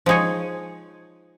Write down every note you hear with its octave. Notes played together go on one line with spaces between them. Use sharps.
F3 G#3 D#4 G#4 C#5